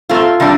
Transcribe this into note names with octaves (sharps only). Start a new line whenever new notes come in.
A#2 A3 C4 F4
C3 G3 D4